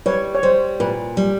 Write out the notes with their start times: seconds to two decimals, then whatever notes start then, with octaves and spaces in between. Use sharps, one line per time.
0.06 G3 B4 C#5
0.35 C#5
0.43 G3 C5
0.80 A#2 B4
1.17 G3